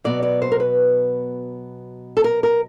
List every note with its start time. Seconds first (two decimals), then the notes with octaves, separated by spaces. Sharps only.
0.04 B2 F#3 B3 D5
0.23 D5
0.42 C5
0.52 A#4
0.60 B4
2.17 A4
2.24 A#4
2.43 A#4